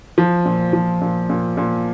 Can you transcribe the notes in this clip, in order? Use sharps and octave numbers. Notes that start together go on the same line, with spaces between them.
F3
A#2
F3
A#2
A#2
A#2